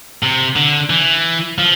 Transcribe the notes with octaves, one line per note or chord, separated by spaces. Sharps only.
C3
D3
E3
F3